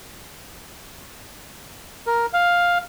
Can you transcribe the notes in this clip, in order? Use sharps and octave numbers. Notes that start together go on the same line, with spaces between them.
A#4
F5